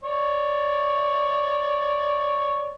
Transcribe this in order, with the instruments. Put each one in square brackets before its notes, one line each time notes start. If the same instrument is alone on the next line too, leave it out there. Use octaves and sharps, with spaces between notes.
[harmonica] C#5 D5